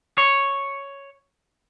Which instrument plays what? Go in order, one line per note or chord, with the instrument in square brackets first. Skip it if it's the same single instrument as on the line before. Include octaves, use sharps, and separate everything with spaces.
[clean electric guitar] C#5